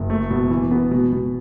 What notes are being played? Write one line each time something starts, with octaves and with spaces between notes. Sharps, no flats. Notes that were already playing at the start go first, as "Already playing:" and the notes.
Already playing: F#1
A3
B2
E3
B3
B2
B2